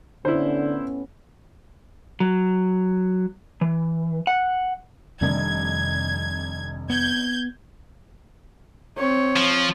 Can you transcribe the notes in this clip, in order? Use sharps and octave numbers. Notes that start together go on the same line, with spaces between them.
A2 D3 B3 C#4 E4 C5
F#3
E3
F#5
F1 F2 D#3 G3 D4 G#6
B3 G6 G#6
C4 C#5
F3